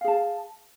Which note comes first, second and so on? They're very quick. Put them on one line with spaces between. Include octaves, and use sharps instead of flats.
F5 G#4 A5